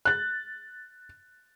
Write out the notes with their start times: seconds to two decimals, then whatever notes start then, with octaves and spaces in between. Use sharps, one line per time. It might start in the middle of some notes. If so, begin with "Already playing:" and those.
0.05 F#6 A6